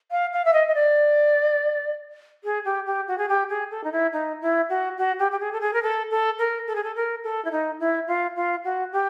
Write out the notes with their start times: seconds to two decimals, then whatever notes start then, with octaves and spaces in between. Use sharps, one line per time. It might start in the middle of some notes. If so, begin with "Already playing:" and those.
0.11 F5
0.33 F5
0.45 E5
0.53 D#5
0.68 D#5
0.75 D5
2.44 G#4
2.65 G4
2.86 G4
3.08 F#4
3.18 G#4
3.29 G4
3.49 G#4
3.71 A4
3.84 D#4
3.92 E4
4.13 D#4
4.42 E4
4.69 F#4
4.97 F#4
5.19 G4
5.32 G4
5.40 G#4
5.52 A4
5.61 G#4
5.73 A#4
5.83 A4
6.11 A4
6.39 A#4
6.67 A4
6.75 G#4
6.84 A4
6.96 A#4
7.23 A4
7.45 E4
7.51 D#4
7.80 E4
8.07 F4
8.36 F4
8.64 F#4
8.92 G4